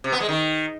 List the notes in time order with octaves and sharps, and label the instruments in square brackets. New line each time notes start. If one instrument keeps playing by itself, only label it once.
[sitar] C3
B3
G#3
D#3